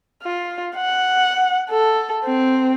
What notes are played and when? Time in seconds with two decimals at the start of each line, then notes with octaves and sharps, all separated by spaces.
0.23 F4
0.77 F#5
1.70 A4
2.25 C4